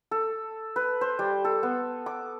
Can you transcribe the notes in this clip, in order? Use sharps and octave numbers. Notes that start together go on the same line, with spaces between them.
A4
B4
C5
G3
A4
B3
D6